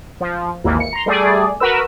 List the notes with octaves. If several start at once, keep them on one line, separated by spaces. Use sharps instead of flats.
F3
G#1 D#2 E3 A#3
C#7
A#5 C6
G3 A3 G#4 D5
F#4 A#4 B4 E6